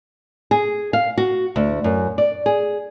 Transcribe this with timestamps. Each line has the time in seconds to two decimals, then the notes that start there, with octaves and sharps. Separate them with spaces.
0.51 G#4
0.93 F5
1.18 F#4
1.56 D2
1.84 F#2
2.18 D5
2.46 G#4